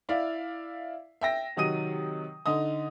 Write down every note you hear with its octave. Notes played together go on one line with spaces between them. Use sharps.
E4 D5 E5 F5
E5 G5 A#6
C3 D#3 F#3 D#6 D#7
D3 D#4 D#6